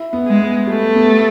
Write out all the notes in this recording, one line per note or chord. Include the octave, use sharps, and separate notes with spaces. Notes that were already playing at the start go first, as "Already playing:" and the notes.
Already playing: E4
B3
G#3
B3
G3 A3
B3